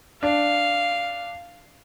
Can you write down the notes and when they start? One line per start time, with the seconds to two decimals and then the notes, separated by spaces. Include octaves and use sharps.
0.23 D4 F5